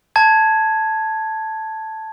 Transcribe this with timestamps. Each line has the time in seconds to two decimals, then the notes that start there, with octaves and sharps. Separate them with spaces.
0.16 A5 G#6